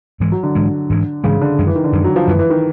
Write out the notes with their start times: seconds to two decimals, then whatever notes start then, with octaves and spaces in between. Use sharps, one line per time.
0.20 G#2 E3 G#3
0.32 F#3
0.43 D3
0.55 G#2 E3 G#3
0.90 G#2 E3 G#3
1.24 G#2 C#3 E3 G#3
1.42 D3
1.59 F#2 D#3 G#3
1.67 E3
1.76 D#3
1.84 D3
1.93 F#2 D#3 G#3
2.04 F#3
2.16 F3
2.27 F#2 D#3 E3 G#3
2.39 E3
2.50 D#3